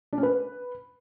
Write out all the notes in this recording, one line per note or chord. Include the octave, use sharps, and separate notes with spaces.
D4
C#4
B4